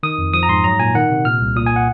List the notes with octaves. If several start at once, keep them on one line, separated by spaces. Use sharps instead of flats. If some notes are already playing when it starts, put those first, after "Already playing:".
D#3 D#6
F2
F3 D#6
A#5
G#2 C6
F#3 A#5
A#2 G#5
D#3 F#5
C3
A#2 F6
C2
A#2 D#6
G#5
F#5